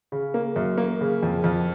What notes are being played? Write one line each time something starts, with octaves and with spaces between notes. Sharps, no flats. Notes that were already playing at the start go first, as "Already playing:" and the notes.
C#3
A#3
F#2
A#3
C#3
F2
F2